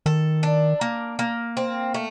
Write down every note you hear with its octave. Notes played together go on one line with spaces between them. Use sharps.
D#3 A4
D4
A#3
A#3
C4
A3